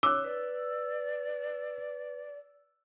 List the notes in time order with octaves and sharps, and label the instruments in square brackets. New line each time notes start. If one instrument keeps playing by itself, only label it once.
[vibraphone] C#5 [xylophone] D6 [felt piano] E6 F#6
[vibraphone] B4 [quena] D5